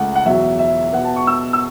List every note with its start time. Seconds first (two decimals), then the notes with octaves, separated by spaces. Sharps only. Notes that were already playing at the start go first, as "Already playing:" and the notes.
Already playing: C#2 C#3 A3 C#4 F#5
0.15 F#5
0.25 E2 B2 F#3 E5
0.59 E5
0.93 B2 B3 F#5
1.05 A5
1.16 C#6
1.27 E6
1.53 E6